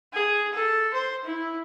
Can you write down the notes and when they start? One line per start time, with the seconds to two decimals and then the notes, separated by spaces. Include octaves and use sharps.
0.13 G#4
0.53 A4
0.94 C5
1.25 E4